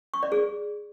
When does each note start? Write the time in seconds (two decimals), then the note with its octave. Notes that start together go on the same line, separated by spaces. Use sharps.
0.14 C#6
0.23 D5
0.32 G#4